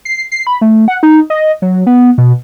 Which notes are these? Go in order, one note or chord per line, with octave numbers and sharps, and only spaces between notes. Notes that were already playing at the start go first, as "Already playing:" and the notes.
C7
C7
B5
A3
F#5
D#4
D#5
F#3
B3
B2